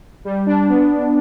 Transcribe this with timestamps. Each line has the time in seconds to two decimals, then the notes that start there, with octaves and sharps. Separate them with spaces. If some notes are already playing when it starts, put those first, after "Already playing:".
0.25 G3
0.46 D4
0.69 B3